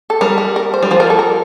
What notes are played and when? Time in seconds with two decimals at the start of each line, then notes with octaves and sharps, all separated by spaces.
0.10 A4
0.21 G3 A#4
0.38 A#4
0.56 A#4
0.74 C5
0.83 G3
0.91 F3 C5
1.00 A#4
1.10 A4
1.19 A#4